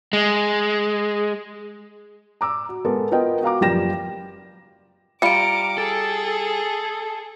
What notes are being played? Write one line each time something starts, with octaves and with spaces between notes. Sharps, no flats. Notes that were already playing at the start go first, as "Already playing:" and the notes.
G#3
A#5 D6 E6
F#4
G#3 B3 A4 A#4
B3 F4 A#4 B4 D#5 G5
F#4 F5 A#5 D6
F#1 F3 G3 G5 A#6 E7
G3 F4 A#5 D6 C#7 D7
G#4 A4